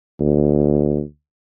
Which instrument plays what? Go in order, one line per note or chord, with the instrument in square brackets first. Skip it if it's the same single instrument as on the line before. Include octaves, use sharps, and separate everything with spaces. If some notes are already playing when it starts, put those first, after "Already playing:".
[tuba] D2